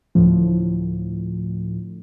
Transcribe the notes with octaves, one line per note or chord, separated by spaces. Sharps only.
D2 A2 F3